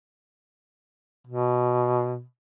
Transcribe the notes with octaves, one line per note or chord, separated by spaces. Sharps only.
B2